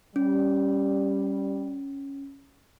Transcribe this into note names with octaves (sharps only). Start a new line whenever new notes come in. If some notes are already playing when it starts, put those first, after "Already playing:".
G3 C#4